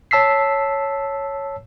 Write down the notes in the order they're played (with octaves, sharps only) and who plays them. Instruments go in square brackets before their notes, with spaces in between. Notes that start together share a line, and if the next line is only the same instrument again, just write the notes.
[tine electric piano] C#5 A5 E6 B6 C7